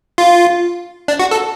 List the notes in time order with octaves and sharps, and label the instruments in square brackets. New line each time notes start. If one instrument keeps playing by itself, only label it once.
[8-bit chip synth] F4
D4
F#4
A4